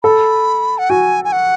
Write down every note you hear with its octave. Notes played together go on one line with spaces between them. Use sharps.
A4 B5
F#5
F#4 G#5
G#5
F#5